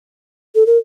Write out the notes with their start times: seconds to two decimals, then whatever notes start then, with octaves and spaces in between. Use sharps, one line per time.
0.55 A4
0.66 A#4